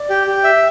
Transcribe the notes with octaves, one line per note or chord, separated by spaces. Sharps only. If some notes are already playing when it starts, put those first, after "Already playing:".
Already playing: D5
G4
G4
E5